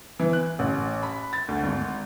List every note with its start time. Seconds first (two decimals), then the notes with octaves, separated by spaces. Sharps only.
0.19 E3
0.33 F#6
0.59 A1
1.03 B5
1.33 A6
1.48 D2
1.63 G#1